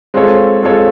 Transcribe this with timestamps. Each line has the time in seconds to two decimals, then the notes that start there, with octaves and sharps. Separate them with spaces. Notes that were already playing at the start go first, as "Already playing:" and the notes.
0.14 G#3 C4 F4 A4 C#5
0.63 G#3 C4 F4 A4 C#5